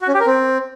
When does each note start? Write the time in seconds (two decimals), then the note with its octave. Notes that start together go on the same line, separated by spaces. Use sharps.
0.02 F#4
0.08 C#4
0.14 G4
0.20 A#4
0.26 C4